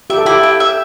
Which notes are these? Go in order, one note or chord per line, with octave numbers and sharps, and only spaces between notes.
G4 E5
A4
E4 G4
G5
E5